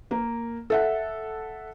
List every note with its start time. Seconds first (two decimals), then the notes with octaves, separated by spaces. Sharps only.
0.11 A#3
0.70 A4 E5 F#5